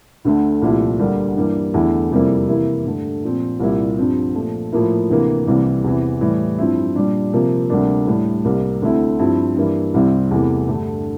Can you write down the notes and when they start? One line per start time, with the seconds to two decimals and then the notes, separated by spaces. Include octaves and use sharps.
0.25 D2 D3 A3
0.62 C2 A#2 F3 A3 E4
0.99 D2 D3 G3 A#3
1.36 G2 E3 G3 A#3
1.74 E2 D3 A3 E4
2.11 F2 C3 G3 A#3 E4
2.48 C3 E3 A#3 E4
2.86 G2 D3 A3
3.23 A#2 F3 C4
3.60 C2 A#2 G3 A#3 E4
3.98 G2 F3 C4
4.34 A#2 F3 A3
4.72 A2 F3 A#3 E4
5.09 D2 C3 E3 A#3
5.47 C2 C3 E3 G3 A#3
5.84 E2 C3 E3
6.21 A2 E3 G3
6.58 G2 F3 C4 E4
6.95 A#2 G3 D4
7.33 C3 F3 A#3
7.70 D2 C3 G3 A#3 D4
8.07 A2 G3 D4
8.45 C2 C3 G3 A#3
8.82 D2 D3 A3 C4 E4
9.19 G2 F3 C4 E4
9.56 G2 E3 G3 A#3 E4
9.94 C2 C3 G3 C4 E4
10.31 E2 C3 E3 A3
10.68 G2 D3 A3